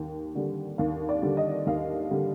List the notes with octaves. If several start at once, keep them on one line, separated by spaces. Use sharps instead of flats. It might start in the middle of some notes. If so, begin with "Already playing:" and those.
Already playing: D#2 G3 G5
D3 G3
D#2 F5
D5
D3 G3
D#5
D#2 F5
D3 G3